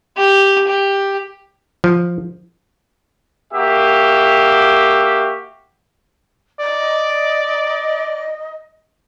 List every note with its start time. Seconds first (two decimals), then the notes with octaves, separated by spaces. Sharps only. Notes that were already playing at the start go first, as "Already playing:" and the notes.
0.18 G4
0.68 G4
1.84 F3
3.54 A#3 F#4 G4 E5
6.60 D5 D#5